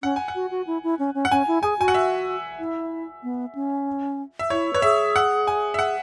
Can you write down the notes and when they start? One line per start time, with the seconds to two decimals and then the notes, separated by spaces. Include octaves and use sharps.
0.03 C#4 F#5
0.16 G#5
0.28 F#5
0.35 F#4
0.51 F#4
0.67 E4
0.84 E4
0.99 C#4
1.15 C#4
1.25 F#5
1.31 C#4 G#5
1.48 E4
1.63 G#4 G#5
1.79 F#4 G#5
1.88 F#5
1.94 E5
2.59 E4
3.23 B3
3.55 C#4
4.39 E5
4.50 E4 C#5
4.73 B4 C#5
4.82 G#4 E5
5.16 F#5
5.47 G#5
5.74 E5
5.79 F#5